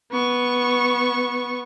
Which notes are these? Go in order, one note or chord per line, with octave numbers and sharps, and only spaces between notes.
B3 C#6